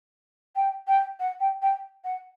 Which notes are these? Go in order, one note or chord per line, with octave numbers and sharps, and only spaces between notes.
G5
G5
F#5
G5
G5
F#5